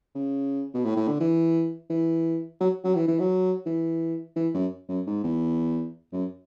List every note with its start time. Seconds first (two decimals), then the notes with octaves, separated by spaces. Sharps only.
0.15 C#3
0.74 B2
0.85 A2
0.96 A2
1.08 D3
1.20 E3
1.90 E3
2.60 F#3
2.84 F#3
2.95 E3
3.08 E3
3.20 F#3
3.66 E3
4.36 E3
4.54 F#2
4.88 F#2
5.07 G#2
5.24 E2
6.12 F#2